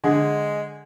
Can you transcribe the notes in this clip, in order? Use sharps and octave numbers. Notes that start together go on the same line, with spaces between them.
D3 G#3 G#4